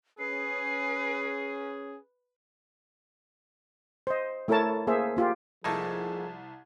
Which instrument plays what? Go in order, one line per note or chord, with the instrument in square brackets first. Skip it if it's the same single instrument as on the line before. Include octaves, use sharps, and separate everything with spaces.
[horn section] C#4 G#4 [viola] B4 [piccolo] C7
[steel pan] C5 D#5
A3 E4 A4 A#4 C#5 A5
A#3 G#4 C5 E5
A#3 F4 G4
[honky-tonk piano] C2 A5 G#6 [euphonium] F3 [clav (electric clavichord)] A3 A#3 D#4 [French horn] G#4